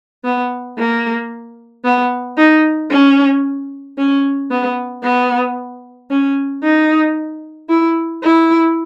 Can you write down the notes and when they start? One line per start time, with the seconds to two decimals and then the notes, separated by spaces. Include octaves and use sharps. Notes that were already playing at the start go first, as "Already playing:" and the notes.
0.24 B3
0.78 A#3
1.85 B3
2.38 D#4
2.90 C#4
3.98 C#4
4.50 B3
5.03 B3
6.10 C#4
6.64 D#4
7.69 E4
8.23 E4